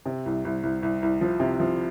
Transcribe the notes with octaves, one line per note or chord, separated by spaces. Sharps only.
C3
C2
C2
C2
C2
C2
F3
C3
F3